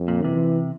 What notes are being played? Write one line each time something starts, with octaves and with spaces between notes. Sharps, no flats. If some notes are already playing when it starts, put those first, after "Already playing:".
Already playing: F2
A#2
C3 E3